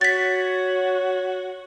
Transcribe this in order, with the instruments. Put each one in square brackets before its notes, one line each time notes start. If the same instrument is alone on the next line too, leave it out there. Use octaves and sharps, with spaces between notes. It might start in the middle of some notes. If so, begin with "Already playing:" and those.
[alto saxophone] F#4 [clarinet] C#5 [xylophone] A6 B6